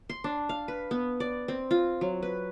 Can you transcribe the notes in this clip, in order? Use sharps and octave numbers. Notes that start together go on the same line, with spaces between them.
C6
D4
F5
B4
B3
D5
C4
F4
F#3
B4